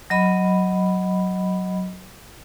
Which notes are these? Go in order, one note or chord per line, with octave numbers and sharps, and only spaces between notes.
F#3 D#5 B5